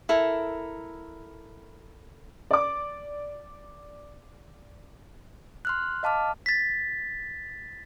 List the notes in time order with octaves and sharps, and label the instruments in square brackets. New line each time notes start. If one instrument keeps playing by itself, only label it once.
[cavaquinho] E4 A4 A#4
[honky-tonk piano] D5 D6
[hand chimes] C6 F6 F#6
D#5 F5 A5 D6 F6
[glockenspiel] A6 B6